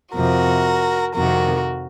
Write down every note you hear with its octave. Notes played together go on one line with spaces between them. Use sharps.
F2 C3 F3 F#4 A#4
F2 C3 D#3 F#4 A#4